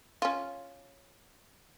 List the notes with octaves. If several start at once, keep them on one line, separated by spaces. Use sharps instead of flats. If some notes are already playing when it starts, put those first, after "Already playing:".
C#4 F4